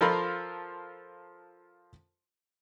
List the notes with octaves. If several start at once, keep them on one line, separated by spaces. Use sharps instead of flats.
F3 F4 A4 A#4 B5 C6